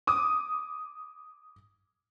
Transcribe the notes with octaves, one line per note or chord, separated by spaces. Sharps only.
D6 D#6